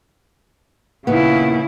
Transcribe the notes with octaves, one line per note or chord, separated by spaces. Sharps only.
D#2 A#2 C#3 B3 E4